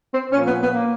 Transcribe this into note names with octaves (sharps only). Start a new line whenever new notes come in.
C4
A#2 F3 C#4
B3
B3
A#3